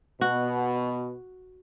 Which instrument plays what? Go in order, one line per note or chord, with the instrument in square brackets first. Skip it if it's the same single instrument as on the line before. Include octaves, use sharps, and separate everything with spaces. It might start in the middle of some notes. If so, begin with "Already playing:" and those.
[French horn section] B2 [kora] F#4